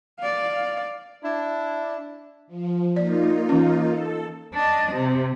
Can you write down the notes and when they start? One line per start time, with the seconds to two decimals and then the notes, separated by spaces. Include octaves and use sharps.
0.19 D5 F5
1.23 D4 E4
2.47 F3
2.96 A#3 D#4 F4 D5
3.49 E3 C#4
3.89 A4
4.54 D4 D#5
4.93 C3